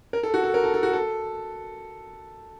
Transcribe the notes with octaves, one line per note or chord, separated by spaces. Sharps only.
A#4
A4
F#4
A4
A#4
A4
A4
F#4
A4